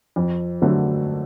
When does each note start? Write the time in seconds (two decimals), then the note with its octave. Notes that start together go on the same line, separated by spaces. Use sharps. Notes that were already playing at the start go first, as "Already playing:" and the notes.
0.16 F2
0.62 D3 F#3 A3